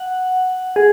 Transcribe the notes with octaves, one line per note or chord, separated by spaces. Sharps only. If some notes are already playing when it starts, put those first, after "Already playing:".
Already playing: F#5
G#4